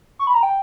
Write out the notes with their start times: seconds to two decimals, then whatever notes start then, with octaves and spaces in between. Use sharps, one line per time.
0.19 C#6
0.27 B5
0.34 A#5
0.43 G5